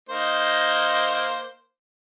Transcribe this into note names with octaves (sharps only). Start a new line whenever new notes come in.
A#3 D#4 C5